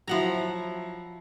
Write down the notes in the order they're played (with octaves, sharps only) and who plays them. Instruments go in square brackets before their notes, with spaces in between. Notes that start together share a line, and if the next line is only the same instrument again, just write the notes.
[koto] F3 F#5 A#5 [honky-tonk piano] F#3 E4